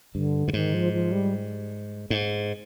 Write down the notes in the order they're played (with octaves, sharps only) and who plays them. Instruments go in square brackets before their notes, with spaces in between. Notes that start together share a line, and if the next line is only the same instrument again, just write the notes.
[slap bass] G2 [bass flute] D3
[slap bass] G2
[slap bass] G#2 [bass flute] D#3
[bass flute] F3
F3
G3
[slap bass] G#2